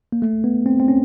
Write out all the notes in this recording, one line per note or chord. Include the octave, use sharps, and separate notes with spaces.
A#3
A3
B3
C4
C4
C#4